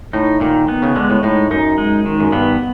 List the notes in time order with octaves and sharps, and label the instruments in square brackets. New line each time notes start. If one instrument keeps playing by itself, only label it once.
[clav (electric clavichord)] A2 [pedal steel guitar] D#4
[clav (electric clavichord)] A#2 [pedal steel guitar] D#3
[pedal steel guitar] B3
[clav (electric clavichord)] C#3
[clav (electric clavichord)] D3 [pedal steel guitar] G#3
[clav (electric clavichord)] A2
[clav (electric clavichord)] A2 [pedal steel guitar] D#4
[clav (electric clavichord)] F#2 [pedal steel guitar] D#4
[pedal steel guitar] G#3
D#3
[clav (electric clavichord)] F#2
[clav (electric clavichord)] G2 [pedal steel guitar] B3